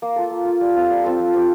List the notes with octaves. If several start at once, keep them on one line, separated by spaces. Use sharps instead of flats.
A#3
F4 A4
A#3
F4 A4
G3
C4 F4 A4
G3
C4 F4 A4
F3
C4 G4